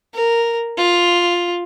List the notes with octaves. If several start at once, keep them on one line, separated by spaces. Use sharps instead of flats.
A#4
F4